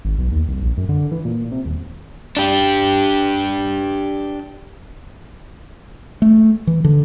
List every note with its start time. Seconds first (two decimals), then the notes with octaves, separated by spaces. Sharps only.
0.05 G#1
0.18 B1
0.32 D#2
0.48 C2
0.62 A#1
0.77 F#2
0.89 D3
1.12 E3
1.25 A#2
1.52 C3
1.65 D#1
2.37 D4 G4
6.22 A3
6.67 E3
6.84 D3